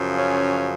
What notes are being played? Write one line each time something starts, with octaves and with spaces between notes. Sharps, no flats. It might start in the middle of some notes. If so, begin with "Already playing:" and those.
Already playing: F#2 C#3 F3
C#4